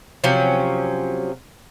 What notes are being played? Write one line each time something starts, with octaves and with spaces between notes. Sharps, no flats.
C3 F3 F#3 C#4